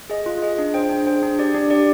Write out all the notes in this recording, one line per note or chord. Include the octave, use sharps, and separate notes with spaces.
G#4 D#5
F4
G#4 D#5
D4
G#4 C5 G5
D4
G#4 C5 G5
D4
G4 D5
D4
G4 D5